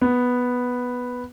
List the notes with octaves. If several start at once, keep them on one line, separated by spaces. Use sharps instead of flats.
B3